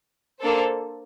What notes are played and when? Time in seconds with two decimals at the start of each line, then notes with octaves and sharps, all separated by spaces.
0.40 A#3 D4 A4 C5